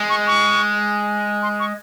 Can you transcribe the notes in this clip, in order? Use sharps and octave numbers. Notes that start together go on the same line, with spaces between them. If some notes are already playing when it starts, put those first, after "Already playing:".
Already playing: G#3
C#6
C#6
C6
C#6